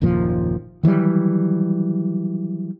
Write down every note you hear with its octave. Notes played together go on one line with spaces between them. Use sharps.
F#1 D#2 A#2 F3
D#3 E3 F#3 G3